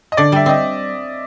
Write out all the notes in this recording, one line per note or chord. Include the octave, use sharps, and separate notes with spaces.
D#5
D3 D5
G3 E5
C4 D#5